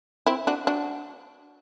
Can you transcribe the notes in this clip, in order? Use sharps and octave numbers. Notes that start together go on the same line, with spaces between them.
C4 E4
D4 F#4
D4 F#4